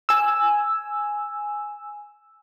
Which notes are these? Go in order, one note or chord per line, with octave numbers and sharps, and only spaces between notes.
G#5 E6